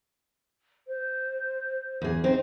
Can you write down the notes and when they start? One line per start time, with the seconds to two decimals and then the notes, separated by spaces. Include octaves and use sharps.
0.88 C5
2.02 E2 G#4
2.24 C4 D#4 C5